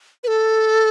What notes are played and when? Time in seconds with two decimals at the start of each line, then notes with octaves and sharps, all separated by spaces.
0.24 B4
0.27 A4